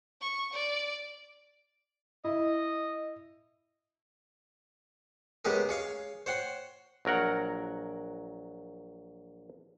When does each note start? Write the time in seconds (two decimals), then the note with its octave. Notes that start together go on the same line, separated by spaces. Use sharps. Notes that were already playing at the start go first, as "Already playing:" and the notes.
0.21 C#6
0.53 D5
2.24 E4 D#5
5.45 C#3 G#3 B3 G4 G#4 A#4
5.69 G#4 C#5 F5
6.26 C5 C#5 F#5 G5 C6
7.05 A#1 F#3 A#4 F#5